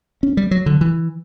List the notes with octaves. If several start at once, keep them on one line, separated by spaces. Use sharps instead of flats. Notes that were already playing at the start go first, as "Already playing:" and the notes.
C#4
G3
F#3
D3
E3